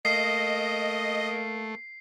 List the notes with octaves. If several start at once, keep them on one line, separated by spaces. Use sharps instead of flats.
A3 A#3 D#5 C7